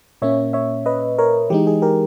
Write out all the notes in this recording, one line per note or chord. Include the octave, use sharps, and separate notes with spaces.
A#2 A#3 C#4 C#5 E5
C#5 E5
B4 D#5
A#4 C#5
E3 G#3 D#4 G4
G#4
G4 A#4